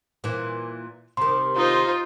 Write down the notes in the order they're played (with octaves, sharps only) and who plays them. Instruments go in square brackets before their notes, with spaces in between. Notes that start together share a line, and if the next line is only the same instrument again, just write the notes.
[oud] A#2 E3
[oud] C3 D#3 [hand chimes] C6
[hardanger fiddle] D#4 C5 [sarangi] F4